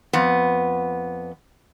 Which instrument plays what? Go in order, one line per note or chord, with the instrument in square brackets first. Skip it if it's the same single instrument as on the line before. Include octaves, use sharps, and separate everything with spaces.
[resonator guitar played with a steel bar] F2 B3